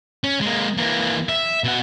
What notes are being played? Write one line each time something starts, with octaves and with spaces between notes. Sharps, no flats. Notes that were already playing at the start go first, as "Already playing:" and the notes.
C#4
G#3 A#3
E3 A#3
E5
B2 F#5